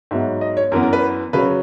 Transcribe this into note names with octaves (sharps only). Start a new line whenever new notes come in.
G#2 F#3 B3 E5
D#5
C#5
F#2 E3 B3 A#4
A#4
B4
C#3 F#3 C#4 B4